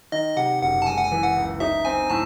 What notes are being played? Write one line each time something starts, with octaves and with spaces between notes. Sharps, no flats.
D#3 D#5
C3 F#5
F#1 F#5
A5
G#3 G#5
F#5
G#5
E3
F#5
C#2
D#4 E5
C4 G#5
A2 A5